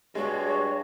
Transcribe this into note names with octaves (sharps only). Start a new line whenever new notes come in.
G2 G#3 F#4 C#5